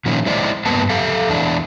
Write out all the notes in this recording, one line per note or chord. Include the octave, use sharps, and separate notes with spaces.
A#2 D#3 F3 C#4 E4
G#3 E4 C5 D5 D#5
G2 A#3 B3 B4 A5
G4 A4 E5 F5
E2 D4 E4